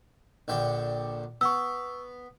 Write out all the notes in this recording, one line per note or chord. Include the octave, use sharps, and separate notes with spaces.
A#1 D3 G5
B3 C#6 E6